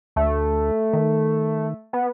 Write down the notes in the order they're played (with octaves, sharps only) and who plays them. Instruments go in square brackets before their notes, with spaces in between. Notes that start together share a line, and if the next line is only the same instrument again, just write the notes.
[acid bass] D2 [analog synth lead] A3
[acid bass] D#3
[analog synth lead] B3